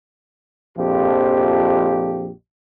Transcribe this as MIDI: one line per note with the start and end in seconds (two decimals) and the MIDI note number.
0.77 2.32 34
0.77 2.32 41
0.77 2.32 53
0.77 2.32 67